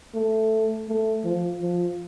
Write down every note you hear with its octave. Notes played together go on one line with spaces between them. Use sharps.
A3
A3
F3
F3